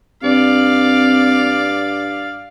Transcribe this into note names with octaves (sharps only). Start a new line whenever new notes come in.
G2 C4 D5 F5